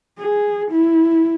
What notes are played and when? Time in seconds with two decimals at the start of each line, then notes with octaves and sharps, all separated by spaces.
0.19 G#4
0.71 E4